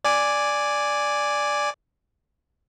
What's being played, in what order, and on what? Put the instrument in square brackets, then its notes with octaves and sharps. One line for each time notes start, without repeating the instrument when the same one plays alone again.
[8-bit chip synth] D5 G#5 D6